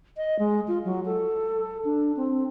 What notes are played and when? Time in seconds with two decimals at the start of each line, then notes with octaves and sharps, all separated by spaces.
0.17 D#5
0.39 G#3
0.68 F4
0.85 F#3
1.05 A4
1.85 D4
2.17 C4